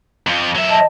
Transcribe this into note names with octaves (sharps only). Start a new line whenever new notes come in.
F2 F3
F#3 E5
D#5 A5